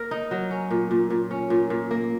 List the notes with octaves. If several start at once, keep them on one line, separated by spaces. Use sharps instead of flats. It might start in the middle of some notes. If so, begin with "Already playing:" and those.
Already playing: A#3 A#4
D#4
F#3
C#4
A#2
A#2
A#2
C#4
A#2
A#2
A#3